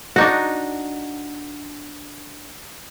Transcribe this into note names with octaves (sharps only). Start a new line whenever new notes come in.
D4 D#4 F#4